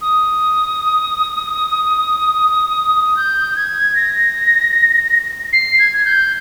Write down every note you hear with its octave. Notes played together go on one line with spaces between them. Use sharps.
D#6
G6
G#6
A#6
C7
G#6
G#6
G6